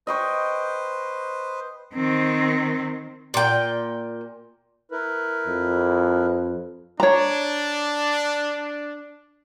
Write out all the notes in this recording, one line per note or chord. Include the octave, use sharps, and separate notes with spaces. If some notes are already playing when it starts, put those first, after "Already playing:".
B4 C5 D#5 G5 C#6
D#3 C4
A#2 G5
E4 A#4 B4
F2
D4 C#5 A#5